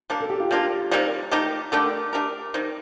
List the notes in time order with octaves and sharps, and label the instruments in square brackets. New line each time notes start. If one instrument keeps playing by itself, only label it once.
[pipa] G3 A#3 D4 [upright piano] A#4
[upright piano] A4
G4
F4
[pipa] G3 A#3 D4 F4 [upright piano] G4
[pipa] C3 D#3 G3 A#3
D#3 A3 D#4 G4
[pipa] D3 A3 D4 G4 [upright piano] A#4
[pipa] A3 D4 G4 A#4
C3 D#3 G3